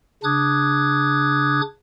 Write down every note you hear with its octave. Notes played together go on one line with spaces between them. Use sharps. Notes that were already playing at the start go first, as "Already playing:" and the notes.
C#3 D4 D6 D#6 F#6 G#6